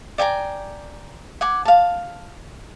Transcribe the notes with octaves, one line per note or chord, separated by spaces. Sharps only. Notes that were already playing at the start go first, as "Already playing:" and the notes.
D5 G5 G#5 A#5
F#5 G#5 D6
F5 A5